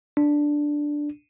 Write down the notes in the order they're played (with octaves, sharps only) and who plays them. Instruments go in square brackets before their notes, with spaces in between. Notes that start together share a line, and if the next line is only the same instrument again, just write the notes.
[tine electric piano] D4